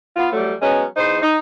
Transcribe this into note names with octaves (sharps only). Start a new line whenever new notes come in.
B3 F4
F2 F#3 G3 A3
F#3 G#3 B3 C#4
E2 D#4 C5
D#4